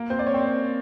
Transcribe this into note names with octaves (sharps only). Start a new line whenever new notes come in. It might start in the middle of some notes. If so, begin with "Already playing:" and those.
Already playing: A#3 A#4
C4 C5
D5
C#4 C#5
C4